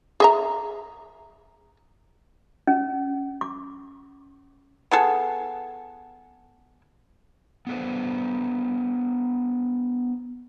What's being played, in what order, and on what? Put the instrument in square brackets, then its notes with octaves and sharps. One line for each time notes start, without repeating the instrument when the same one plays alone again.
[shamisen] G#4 E5 A#5
[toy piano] C#4
D6
[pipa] B3 G#4 A4
[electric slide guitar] B3 D4 A4 B4 C5